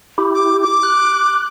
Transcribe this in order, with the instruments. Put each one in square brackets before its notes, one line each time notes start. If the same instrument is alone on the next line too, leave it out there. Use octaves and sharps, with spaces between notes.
[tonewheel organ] E4 G4
[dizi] D6
D6
[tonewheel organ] F#6